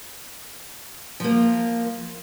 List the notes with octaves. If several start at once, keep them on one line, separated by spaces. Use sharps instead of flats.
F3 A#3